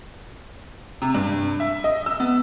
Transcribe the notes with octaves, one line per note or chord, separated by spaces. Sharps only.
C3
G2
E5
D#5
E6
B3